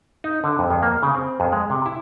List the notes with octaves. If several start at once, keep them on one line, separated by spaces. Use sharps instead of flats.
D#4
D3
F2
F2
A#3
C#3
C4
F2
G#3
C3
E4